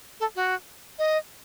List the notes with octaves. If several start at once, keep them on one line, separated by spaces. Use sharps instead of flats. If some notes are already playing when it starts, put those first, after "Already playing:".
A4
F#4
D#5